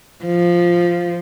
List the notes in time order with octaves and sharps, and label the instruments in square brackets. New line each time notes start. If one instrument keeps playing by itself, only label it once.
[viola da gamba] F3